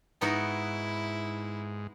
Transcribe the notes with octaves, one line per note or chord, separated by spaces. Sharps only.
G#2 B3 D#4 E4 F#4